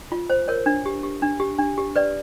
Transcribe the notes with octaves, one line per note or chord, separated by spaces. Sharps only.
F4
C5
A#4 C#5
D4
G4
G4
D4
G4
D4
G4
B4 D5